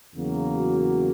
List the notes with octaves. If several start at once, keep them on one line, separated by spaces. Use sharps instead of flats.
E2 C#3 F#3 A#3
F#4